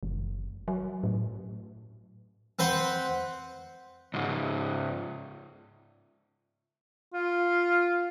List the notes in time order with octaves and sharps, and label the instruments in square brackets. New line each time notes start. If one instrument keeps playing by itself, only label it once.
[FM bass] F#1
F#3
A2
[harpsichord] C4 B4 C5 F#5
[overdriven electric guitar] C#2 G#2
[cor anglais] F4